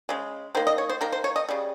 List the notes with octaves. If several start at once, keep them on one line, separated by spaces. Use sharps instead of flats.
C#3 G#3
D#3 A#3 C5
D#5
C#5
C5
D#3 A#3 A#4
C5
C#5
D#5
C#3 G3